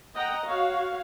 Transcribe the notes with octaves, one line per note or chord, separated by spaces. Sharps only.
D#5 F#5 G5 A#5
F#4 C#5 F5